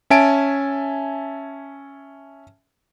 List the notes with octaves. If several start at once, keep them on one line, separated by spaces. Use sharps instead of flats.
C#4 E5 G#5 A5 D7